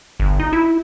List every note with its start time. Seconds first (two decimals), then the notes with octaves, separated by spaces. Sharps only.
0.20 G1
0.40 D#4
0.53 E4